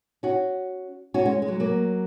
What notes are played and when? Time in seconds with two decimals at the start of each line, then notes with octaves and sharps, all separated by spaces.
0.23 C#4 F#4
1.14 C#4 F#4
1.26 G#3 C#4
1.42 G#3
1.48 F#3
1.60 F#3 A#3